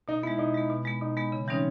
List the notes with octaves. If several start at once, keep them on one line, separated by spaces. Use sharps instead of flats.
B2 D#4
G#3 B3 E4
B2 D#4
G#3 B3
B2
G#3 B3
B2 D#4
G#3 B3
C#3
E3 G3 C4 C#4 D#4